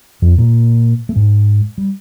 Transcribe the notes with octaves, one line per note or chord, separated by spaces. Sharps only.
F2 F3
A#2 A#3
A3
G#2 G#3
G3